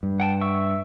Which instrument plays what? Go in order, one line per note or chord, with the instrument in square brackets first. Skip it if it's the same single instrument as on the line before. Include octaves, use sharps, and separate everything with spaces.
[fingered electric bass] G2
[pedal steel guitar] F#5 G5 A5
E5 C#6 E6